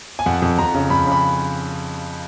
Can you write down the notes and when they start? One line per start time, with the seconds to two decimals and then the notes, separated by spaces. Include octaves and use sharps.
0.19 G#5
0.26 F2 F#5
0.42 F2
0.58 F2 A#5
0.75 C#3
0.90 F2 B5
1.07 C#3
1.12 B5